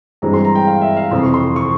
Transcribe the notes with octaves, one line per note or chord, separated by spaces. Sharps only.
G2 E3 G#3 C4 A#5
C6
A#5
G5
F5
E5
F5
F2 C3 E3 C6
C#6
C6
C#6